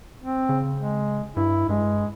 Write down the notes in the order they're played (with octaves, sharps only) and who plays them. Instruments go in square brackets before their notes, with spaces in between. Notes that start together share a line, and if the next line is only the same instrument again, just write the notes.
[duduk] C4
[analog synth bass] C#3
[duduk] G#3
[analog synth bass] G2 [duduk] E4
[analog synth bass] G2 [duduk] G#3